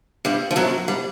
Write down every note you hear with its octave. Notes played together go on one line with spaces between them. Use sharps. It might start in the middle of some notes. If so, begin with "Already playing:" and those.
G2 G3
F3
F#2 F#3
G3